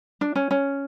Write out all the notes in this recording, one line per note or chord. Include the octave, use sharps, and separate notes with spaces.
D4
C#4
C#4